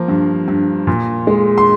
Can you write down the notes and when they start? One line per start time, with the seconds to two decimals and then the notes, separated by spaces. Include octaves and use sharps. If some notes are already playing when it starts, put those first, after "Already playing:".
Already playing: F3 A#3
0.08 G2
0.48 G2
0.87 A#2
1.27 G#3
1.58 C6